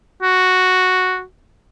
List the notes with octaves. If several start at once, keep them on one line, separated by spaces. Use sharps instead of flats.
F#4